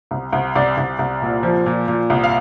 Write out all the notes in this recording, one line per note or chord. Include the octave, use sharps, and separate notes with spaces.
C2
C2
C2 D5
C2
C2
A#2
F3
A#2
A#2
C2
F5